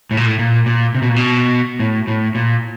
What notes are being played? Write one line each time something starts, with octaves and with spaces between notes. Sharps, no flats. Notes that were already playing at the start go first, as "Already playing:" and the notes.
A2
A#2
A2
A#2
A#2
C3
B2
A#2
B2
A2
A2
A#2